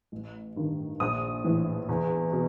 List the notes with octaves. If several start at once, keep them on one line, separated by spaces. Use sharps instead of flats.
A1
G2 D#3
A#1 D#6
A2 E3
E2
B2